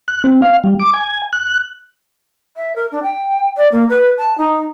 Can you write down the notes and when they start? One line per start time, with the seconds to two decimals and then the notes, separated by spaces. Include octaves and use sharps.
0.08 F#6
0.24 C4
0.42 F5
0.64 G3
0.80 D6
0.93 G#5
1.33 F#6
2.56 E5
2.76 A#4
2.92 D4
3.03 G5
3.57 D5
3.72 A#3
3.89 B4
4.18 A5
4.37 D#4